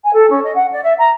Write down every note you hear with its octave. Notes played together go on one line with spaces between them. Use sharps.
G#5
A4
C#4
D#5
F#5
D5
E5
A#5